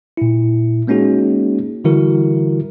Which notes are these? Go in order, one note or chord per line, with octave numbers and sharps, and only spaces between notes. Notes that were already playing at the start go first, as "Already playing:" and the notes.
A#2 E4
G#3 A#3 C#4 D#4 F#4 G#4
D3 E3 G3 E4 F#4 A#4